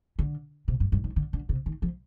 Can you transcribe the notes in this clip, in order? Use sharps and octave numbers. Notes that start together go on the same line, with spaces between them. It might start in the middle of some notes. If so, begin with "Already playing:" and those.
D3
C3
G2
G2
D#3
D3
D3
C3
D#3
F3